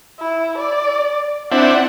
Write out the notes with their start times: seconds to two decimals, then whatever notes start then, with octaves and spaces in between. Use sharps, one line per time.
0.20 E4
0.58 D5
1.52 C4 D4 E4 F#5